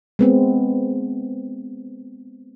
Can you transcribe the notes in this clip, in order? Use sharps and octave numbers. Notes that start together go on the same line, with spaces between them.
G#3 B3 C4